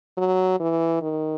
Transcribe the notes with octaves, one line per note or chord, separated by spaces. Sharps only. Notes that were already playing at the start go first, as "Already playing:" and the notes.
F#3
E3
D#3